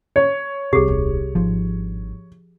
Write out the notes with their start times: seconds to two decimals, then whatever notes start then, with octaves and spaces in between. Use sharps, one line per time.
0.16 C#5
0.73 C2 C3 G4 G#4
0.88 D#1
1.35 G#1 G2 F3